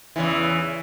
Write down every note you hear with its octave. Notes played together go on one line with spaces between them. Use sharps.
E2 C#3 E3